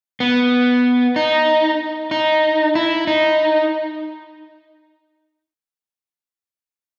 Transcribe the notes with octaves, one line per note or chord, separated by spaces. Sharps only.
B3
D#4
D#4
E4
D#4